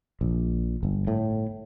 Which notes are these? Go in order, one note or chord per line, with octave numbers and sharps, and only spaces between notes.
A#1
G1
A2